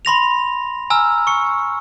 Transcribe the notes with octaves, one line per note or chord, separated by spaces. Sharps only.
B5 C6 A#6 F7
G#5 A#5 E6 F6
C#6 C#7